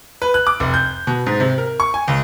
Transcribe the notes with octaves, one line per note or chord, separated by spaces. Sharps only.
B4
F#6
D6
F1
G6
B2
G#2
C3
A#4
C#6
G#5
C#2